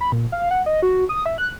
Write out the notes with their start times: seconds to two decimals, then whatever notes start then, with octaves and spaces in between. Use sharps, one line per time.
0.01 B5
0.12 A#2
0.32 F5
0.51 F#5
0.66 D#5
0.82 F#4
1.09 D#6
1.26 E5
1.38 F#6